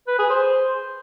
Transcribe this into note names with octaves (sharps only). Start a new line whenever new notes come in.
B4
G#4
C5